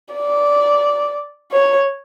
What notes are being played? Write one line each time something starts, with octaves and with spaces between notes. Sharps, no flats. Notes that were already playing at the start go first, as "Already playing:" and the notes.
D5
C#5